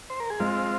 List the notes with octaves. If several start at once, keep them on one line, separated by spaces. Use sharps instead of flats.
C5
A#4
G#4
G#3 C4 F4